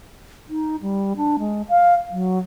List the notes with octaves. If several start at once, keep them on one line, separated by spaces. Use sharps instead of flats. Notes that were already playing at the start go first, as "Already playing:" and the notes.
D#4
G3
D4
G#3
F5
F#3